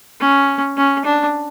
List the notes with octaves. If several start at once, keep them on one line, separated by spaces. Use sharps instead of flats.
C#4
C#4
D4